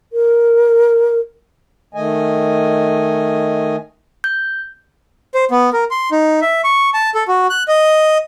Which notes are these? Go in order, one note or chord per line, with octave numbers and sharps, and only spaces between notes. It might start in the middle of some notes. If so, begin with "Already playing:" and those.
A#4
D#3 A3 D#5 G#5
G6
C5
B3
A#4
C6
D#4
E5
C#6
A5
A4
F#4
F#6
D#5